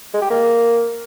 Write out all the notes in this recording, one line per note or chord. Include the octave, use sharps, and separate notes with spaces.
G#3
G4
A#3